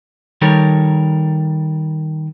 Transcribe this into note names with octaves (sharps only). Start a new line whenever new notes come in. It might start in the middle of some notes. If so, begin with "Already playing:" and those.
D#3 G3 A4 A#4 C#5